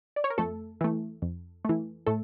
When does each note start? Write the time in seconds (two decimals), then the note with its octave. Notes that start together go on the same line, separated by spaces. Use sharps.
0.16 D5
0.24 C#5
0.30 A#4
0.38 F2 A3 A4
0.81 E3 A3
1.22 F2
1.65 E3 A3
2.07 A2 A3 A4